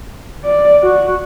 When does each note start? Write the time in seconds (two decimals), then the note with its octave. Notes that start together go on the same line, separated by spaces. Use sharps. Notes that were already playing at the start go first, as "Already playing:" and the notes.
0.44 D5
0.83 F#4